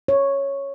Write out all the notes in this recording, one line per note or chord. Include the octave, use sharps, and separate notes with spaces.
C#5